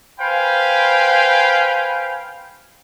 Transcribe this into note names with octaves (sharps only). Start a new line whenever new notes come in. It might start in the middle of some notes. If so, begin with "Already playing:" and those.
B4 C5 F5 G5 G#5 B5